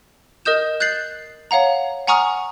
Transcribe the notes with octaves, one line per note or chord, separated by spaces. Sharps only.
A#4 D#5 D#6 G6 E7
F#6 G6 A6 C7 F#7
C#5 F5 F#5 A#5
F#5 G#5 A#5 C#6 D#6 F6